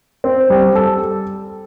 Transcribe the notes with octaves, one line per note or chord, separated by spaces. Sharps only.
C4
G3
A4